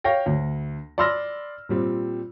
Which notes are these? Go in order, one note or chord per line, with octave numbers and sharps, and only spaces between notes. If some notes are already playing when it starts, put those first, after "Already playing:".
C#5 F5 G5 A#6
D2
D5 B5 C6 E6 F6 A#6
A#2 G3 C4